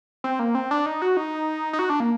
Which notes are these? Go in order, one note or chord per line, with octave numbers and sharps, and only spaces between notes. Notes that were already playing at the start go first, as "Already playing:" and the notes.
C4
A#3
C4
D4
D#4
F#4
D#4
D#4
F#4
D4
A#3